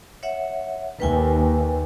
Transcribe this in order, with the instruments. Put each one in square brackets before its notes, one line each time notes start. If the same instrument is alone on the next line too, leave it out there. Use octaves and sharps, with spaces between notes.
[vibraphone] C#5 E5 F#5
[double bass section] D#2 [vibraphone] B4 G5 G#5